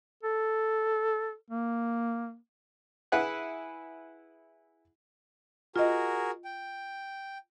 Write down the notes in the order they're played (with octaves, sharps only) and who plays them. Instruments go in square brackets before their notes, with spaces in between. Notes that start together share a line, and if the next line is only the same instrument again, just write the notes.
[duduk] A4
A#3
[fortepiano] E4 G#4 B4 F#5 F#6
[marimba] F4 D#5 [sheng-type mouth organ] F#4 G#4 A#4
[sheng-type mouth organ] G5